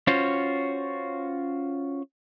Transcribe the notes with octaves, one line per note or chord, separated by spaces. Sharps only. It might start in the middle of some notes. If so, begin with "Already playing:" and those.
C#4 F4 F#4 C5 C#5